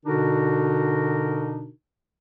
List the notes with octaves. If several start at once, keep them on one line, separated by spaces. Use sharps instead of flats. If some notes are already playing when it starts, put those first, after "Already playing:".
B2 D3 D4 D#4 F#4 A#4